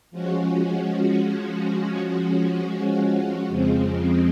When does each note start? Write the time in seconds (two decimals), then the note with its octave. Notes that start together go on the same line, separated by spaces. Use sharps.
0.11 F3 G#3 C#4 F#4
3.48 F2 C#3 F3 G#3 C4